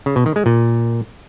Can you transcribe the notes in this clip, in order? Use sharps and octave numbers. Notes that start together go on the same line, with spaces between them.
C#3
B2
D#3
G#3
A#2